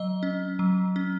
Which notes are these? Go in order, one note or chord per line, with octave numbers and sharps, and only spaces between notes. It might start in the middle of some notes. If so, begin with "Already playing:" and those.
Already playing: F#3 D#5
C#4
F#3
C#4